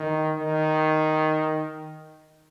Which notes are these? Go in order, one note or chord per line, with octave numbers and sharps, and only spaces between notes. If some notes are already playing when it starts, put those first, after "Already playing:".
Already playing: D#3
D#3